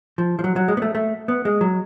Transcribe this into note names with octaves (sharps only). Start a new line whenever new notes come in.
F3
F3
F#3
F#3
G#3
B3
A3
A3
B3
G#3
F#3